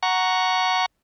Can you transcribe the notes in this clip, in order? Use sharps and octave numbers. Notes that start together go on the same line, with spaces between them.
F#5 A#5 C#6